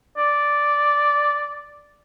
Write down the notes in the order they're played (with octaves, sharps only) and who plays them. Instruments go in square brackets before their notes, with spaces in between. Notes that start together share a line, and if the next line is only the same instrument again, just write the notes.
[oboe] D5